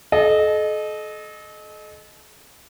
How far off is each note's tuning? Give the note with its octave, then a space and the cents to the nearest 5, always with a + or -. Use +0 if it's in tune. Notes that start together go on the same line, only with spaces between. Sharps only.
A4 -40 D#5 -15